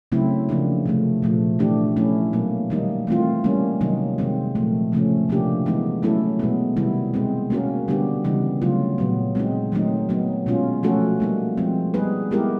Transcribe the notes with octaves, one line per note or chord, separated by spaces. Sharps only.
C#3 F#3 A3 C4 E4
C#3 F3 A#3 D4
C3 F3 A3
A#2 F3 A3
E3 A3 D4 G4
F3 A3 C#4 E4
B2 F#3 A#3
D#3 G3 A#3 D#4
E3 A3 C4 F4
G3 A#3 C#4
C3 D#3 F#3 A#3 D#4
C3 D#3 G#3 C4
A#2 F3 A3
C#3 F3 A3 C#4
C3 F3 A#3 D4 G4
E3 G#3 B3 D#4
F#3 A3 C#4 E4 A4
B2 G#3 B3
C3 D#3 G3 B3 E4
B2 G#3 C4
A#3 C#4 F#4 A#4
D3 G3 B3 D4 G4
C#3 E3 G3 B3 D#4
C#3 F#3 A3 C4 F4
A#2 F#3 B3
G#3 C4 D#4
D#3 F#3 A3 C4 D#4
F#3 B3 D#4
B2 G#3 C#4 F4
F3 A3 C#4 F#4 A4
G3 A#3 D#4
F3 G#3 C4
G3 B3 D#4 G#4 B4
G#3 B3 E4 G4 A#4